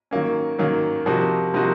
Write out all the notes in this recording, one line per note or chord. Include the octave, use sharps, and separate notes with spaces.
D#3 F#3 A#3 C#4
D#3 F#3 A#3 C#4
C3 F3 A#3 D#4 F#4
C3 F3 A#3 D#4 F#4